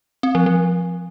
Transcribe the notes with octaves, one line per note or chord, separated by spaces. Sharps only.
C4
F3
F3